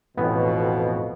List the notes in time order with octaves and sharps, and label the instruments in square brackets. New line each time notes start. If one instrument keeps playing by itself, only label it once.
[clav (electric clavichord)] A1 B3 [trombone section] F2 B2